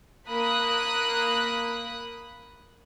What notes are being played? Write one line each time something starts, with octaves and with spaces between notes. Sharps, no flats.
A#3 B5 D#6 F#6